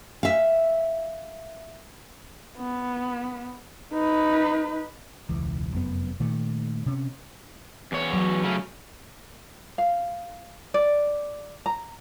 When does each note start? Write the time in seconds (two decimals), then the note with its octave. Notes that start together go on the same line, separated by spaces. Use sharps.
0.23 E5 F5
2.58 B3
3.93 D#4 B4
5.29 E1 C#2 E3
5.72 F1 F#2 A#2 B3
6.20 A#2 D#3 A3
6.86 C3 C#4
7.92 E2 C#5
8.13 F#3
8.44 C#3 A3 C#4
9.78 F5
10.74 D5
11.66 A#5